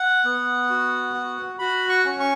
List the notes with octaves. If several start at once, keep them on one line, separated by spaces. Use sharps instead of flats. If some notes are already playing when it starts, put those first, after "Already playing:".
Already playing: F#5
B3
F#4
F#4
F#4 B5
C#6
C#4
C#6